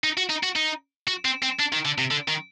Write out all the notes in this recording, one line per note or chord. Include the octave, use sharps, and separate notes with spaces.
D#4
F#4
D#4
F#4
D#4
F#4
C4
C4
D4
D#3
D3
C3
D3
D#3